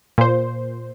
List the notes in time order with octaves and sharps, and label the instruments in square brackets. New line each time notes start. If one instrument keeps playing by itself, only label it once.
[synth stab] A#2 C5